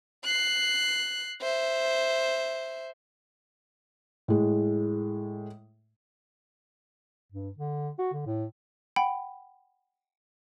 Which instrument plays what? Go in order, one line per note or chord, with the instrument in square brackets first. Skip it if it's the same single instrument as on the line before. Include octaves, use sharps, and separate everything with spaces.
[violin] F#6 C7
C5 E5
[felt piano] A2 G#3
[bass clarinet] G2
D3
F#4
D3
A2
[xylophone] F#5 G5 B5